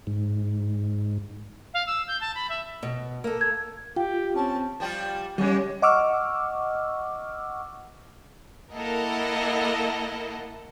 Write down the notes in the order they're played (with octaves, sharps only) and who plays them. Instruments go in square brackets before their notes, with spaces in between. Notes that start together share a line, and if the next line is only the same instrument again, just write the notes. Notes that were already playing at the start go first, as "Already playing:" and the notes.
[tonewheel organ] G#2
[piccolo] F5
E6
G6
A5
B5
E5
[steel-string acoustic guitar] B2
A#3 A4
[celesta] G#6
[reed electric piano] F4 [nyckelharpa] G4 [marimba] G5
[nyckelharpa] C4 C#4 [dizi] A5
[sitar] F3 G3 F4
[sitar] C#3 G#3 [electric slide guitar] G3 C#4
[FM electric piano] D#5 F#5 C#6 D6 E6 F6
[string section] A#3 E4 A4 A#4 D#5 F#5